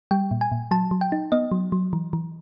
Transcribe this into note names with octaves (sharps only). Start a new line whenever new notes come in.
G3 G5
A#2
G#5
A#2
F#3 A5
F#3
G5
D#4
B3 D#5
F#3
F#3
E3
E3